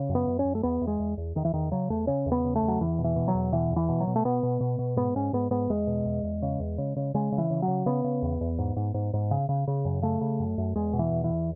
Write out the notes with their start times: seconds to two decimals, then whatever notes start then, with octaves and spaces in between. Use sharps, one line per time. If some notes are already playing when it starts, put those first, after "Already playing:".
Already playing: C#3
0.09 F#2
0.15 B3
0.27 F#2
0.39 C#4
0.45 F#2
0.55 A3
0.63 E2 B3
0.81 E2
0.87 G#3
1.00 E2
1.17 E2
1.35 E2 D#3
1.45 E3
1.53 E2 D#3
1.71 C#3 F#3
1.90 E2 A3
2.07 C#3 C#4
2.26 E2
2.32 B3
2.44 C#3
2.55 A3
2.62 E2
2.68 F#3
2.81 E2 E3
2.99 B2
3.04 E3
3.16 B2
3.28 F#3
3.34 E2
3.52 B2 E3
3.71 E2
3.76 E3
3.89 B2
4.00 F#3
4.07 B2
4.16 A3
4.25 B2 B3
4.43 B2
4.61 B2
4.79 B2
4.97 G#2 B3
5.16 G#2 C#4
5.33 G#2 B3
5.51 G#2 B3
5.70 E2 G#3
5.87 B2
6.06 E2
6.23 E2
6.42 C#3
6.60 E2
6.78 C#3
6.96 C#3
7.14 C#3 G#3
7.32 C#3
7.38 E3
7.50 C#3
7.62 F#3
7.68 C#3
7.86 C#3 B3
8.04 C#3
8.22 E2
8.41 E2
8.58 G#2
8.76 G#2
8.94 G#2
9.13 G#2
9.31 C#3
9.49 C#3
9.67 C#3
9.85 F#2
10.02 C#3 A3
10.21 C#3
10.40 F#2
10.58 F#2
10.76 E2 G#3
10.93 B2
10.99 E3
11.11 E2
11.24 E3
11.29 E2